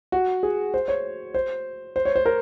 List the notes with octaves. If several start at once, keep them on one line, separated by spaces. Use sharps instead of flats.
F#4
G#4
C5
C#5
C5
C5
C#5
C5
A#4